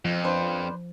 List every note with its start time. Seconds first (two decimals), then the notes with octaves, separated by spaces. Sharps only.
0.05 F2 F3
0.24 D4 B4 C5